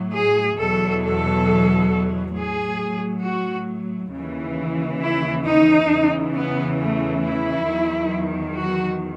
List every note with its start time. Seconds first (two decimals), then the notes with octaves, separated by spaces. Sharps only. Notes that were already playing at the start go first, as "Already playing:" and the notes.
Already playing: A2 F#3
0.14 G#4
0.58 E2 B2 F#3 A4
1.03 A4
2.36 A2 F#3 G#4
3.24 F#4
4.12 D#2 C#3 E3
5.01 E4
5.45 D#4
5.90 E2 C#3 E3
6.34 B3
6.78 A3
7.22 E4
7.67 E2 D#3 F#3
8.55 F#4